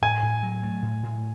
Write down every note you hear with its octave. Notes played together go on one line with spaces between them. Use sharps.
A2 G#5
A2
F#3
A3
A2
A2